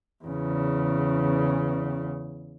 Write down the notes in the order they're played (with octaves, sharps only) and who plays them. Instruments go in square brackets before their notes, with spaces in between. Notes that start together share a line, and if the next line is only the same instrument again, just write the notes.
[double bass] E2 C#3